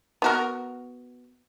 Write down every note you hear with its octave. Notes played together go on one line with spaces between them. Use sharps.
B3 F#4 A#4